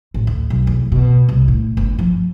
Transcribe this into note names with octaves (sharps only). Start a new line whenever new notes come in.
A1
D2
B1
E2
B2
C2
A2
G1
F3